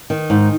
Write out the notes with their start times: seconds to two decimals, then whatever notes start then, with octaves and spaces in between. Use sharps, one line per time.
0.10 D#3
0.30 G#2